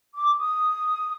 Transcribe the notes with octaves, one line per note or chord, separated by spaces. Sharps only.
D6
D#6